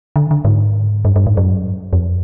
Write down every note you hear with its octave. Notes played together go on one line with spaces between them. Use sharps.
D3
D3
G#2
G2
G2
G#2
F#2
F2